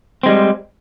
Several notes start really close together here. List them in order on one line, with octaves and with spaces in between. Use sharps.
C4 G#3 G3